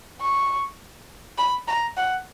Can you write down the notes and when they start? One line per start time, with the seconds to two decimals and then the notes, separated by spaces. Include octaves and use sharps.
0.21 C#6
1.38 B5
1.68 A#5
1.97 F#5